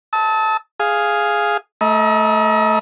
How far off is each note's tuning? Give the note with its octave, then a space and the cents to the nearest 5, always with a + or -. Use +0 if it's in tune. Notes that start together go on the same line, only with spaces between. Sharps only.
A5 +0 E6 -45
G#4 +0 F5 +0
A3 +0 D#5 +35 A#5 +35